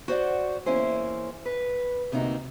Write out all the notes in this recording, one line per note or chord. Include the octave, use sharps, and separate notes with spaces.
F#4 C5 D5 F#5
E2 A#3 C#4 E4 C5 G#5
B4
D2 C3 A#3 D4 D#4 F#4